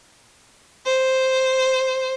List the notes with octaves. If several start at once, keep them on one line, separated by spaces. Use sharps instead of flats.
C5